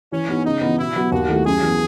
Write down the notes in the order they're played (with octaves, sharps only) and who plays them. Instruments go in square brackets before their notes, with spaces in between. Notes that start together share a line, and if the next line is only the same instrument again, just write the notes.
[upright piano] E3 [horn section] C#4
[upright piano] B3 D#4
[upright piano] C#3 [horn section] D#4
[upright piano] E3 B3
[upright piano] B2 [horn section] E4
[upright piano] F#3 B3 F#4
[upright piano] D#2 [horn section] F#4
[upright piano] D#3 A3 E4
[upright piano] F#2 [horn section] G#4
[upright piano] E3 B3